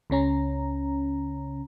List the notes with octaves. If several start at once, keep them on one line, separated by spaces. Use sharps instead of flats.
C#2 C#3 C#4 A#5